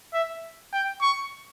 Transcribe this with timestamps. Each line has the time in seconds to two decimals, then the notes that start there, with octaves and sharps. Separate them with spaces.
0.14 E5
0.73 G5
1.02 C#6